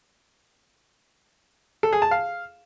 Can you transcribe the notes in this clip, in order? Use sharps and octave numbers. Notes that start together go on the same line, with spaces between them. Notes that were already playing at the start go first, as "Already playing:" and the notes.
A4
G#4
A5
F5